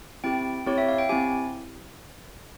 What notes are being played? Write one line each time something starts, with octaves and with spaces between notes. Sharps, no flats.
C4 E4 G4 G5
C4 E4 G4 C#5
E5
F5
G5
C4 E4 G4 G#5